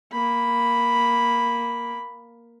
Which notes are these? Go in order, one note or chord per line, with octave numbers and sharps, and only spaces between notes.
A#3 B5